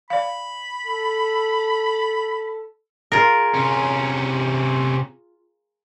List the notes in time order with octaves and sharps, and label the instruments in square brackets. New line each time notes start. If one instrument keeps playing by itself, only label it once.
[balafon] D5 F5 [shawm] B5
[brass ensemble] A4
[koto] F4 G#4 A#4
[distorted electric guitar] C3 C#4